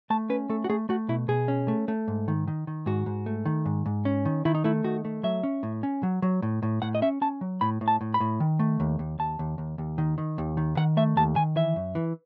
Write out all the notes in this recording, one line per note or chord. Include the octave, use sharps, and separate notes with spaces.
A3 A5
C#4 B4
A3 A4
F#4
A3 G#4
A3 F#4
B2 E4
B2 G#4
C#4
A3
A3
G#2
D#3
D#3
D#3
G#2 F#4
G#2
A3
D#3
G#2
G#2
C#4
D#3
D#3 E4
D#4
A3 E4
D#3 F#4
A3
F#3 E5
C#4
A2
C#4
F#3
F#3
A2
A2
A2 F#5
D#5
C#4 E5
C#4 A5
F#3
A2 B5
A2
A5
A2
B5
A2
D#3
A3
D#2
D#2
D#2 A5
D#2
D#2
D#2
D#3
D#3
D#2
D#3
D#3 F#5
A3 E5
D#2 A5
D#3 G#5
E3 E5
F#2
E3